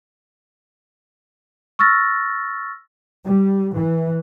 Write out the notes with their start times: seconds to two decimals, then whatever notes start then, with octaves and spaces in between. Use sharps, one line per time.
1.79 C#6 E6 F6 A6 A#6
3.25 G3
3.75 E3